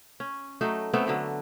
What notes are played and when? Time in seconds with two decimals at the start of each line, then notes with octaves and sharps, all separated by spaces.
0.20 C#4
0.61 F#3 A3 D#4
0.94 A3 B3 C4
1.07 D3 F#3 B3